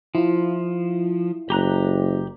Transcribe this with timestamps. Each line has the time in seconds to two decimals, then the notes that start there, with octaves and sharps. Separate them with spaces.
0.15 F3 E4 F4
1.50 F#1 G4 A#5 F#6